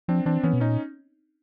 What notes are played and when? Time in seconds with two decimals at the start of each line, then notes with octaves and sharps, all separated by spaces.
0.08 F3 C4 D4
0.26 E3 C4 D4
0.43 E3 B3 C#4
0.53 B2
0.60 A#2 C#4 D#4